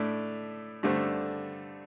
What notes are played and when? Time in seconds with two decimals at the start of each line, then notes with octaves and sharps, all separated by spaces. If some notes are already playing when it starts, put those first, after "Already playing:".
Already playing: A2 A3 D4
0.83 G2 D3 A3 C4